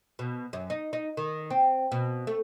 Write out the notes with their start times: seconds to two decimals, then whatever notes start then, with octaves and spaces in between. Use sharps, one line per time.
0.19 B2
0.53 F#2
0.70 D#4
0.93 D#4
1.17 D#3
1.50 C4
1.92 B2
2.27 A3